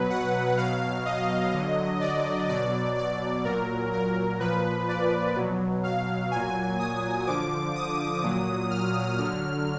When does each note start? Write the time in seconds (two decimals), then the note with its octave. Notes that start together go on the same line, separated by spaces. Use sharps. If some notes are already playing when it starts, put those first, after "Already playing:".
Already playing: B2 F#3 B4
0.10 F#5
0.57 B2 F#3 F5
1.05 D#5
1.54 D3 F#3
2.01 D5
2.49 B2 F#3 D5
2.97 D5
3.45 A#2 F#3 A#4
3.93 A#4
4.40 A#2 F3 B4
4.88 D5
5.36 B2 F#3
5.84 F5
6.31 A#2 F#3 G#5
6.79 D#6
7.27 D3 F3 D6
7.75 D#6
8.23 A#2 F#3
8.71 F6
9.18 D3 F#3 F6